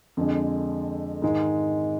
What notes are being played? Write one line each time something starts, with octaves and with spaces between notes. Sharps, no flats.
F2 D3 G#3
G#2 D#3 G#3